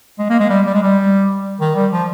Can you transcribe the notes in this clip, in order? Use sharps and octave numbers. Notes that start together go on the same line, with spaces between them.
G#3
A#3
G#3
G3
G3
G#3
G3
D#3
G3
F3